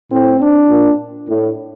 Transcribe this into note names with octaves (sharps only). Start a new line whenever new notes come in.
A2 C4
D4
A#2
A2